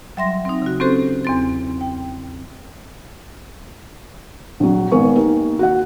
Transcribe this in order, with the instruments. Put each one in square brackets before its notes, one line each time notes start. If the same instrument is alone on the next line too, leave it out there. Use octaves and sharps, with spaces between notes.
[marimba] F#3 G3 E5 C6 A#6
C4 D#4
C#3 F#4
C4 C#4 F#4 G4 A4 C5
E2 C4 A6
G5
[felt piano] A#1 F#3
G#1 B3 A#4 G#5 C#6
D#3 A#3 G4
F#4 F#5